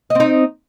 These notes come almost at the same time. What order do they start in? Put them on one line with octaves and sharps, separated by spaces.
D#5 C4 D#4